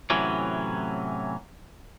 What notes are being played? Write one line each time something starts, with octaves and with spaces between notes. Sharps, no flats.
A2 C3 E3 F#3 C#4